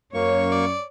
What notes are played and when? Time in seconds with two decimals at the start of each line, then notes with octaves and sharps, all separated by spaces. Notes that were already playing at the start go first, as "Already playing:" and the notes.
0.14 F#2 A#3 C#5 C#6
0.52 D5